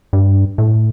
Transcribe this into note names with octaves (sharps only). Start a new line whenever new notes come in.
G2
A2